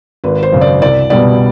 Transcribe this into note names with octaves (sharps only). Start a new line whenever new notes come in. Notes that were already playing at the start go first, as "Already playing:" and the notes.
G#1 B4
C5
F#2 C#3
D5
C2 D5
B2 G3 B3 D5